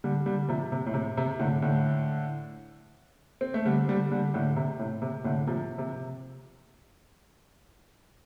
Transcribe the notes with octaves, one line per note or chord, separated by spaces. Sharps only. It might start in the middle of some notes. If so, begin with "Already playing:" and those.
D3 G3
D3 G3
C3 F3
C3
A2
C3
C3
A2 D3
A2 D3
C4
A3
D3 G3
D3 G3
D3 G3
A2 D3
C3
A2
C3
A2 D3
C3 F3
C3